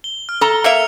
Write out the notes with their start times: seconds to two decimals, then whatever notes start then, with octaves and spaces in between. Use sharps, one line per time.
0.04 G7
0.29 F6
0.41 A4 A#5
0.64 A#3 A#4 E5 C#7 F7